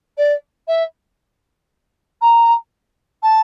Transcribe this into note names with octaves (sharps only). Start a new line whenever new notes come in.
D5
E5
A#5
A5